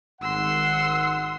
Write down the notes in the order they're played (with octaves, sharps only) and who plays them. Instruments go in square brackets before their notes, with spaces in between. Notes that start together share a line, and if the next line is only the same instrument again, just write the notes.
[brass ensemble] G#1 F#5 [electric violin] C6 E6